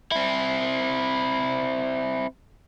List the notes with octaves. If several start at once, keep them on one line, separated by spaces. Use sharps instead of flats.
C4 E4